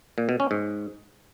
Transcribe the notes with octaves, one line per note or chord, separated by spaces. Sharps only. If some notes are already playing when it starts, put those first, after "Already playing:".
A#2
B2
C#4
G#2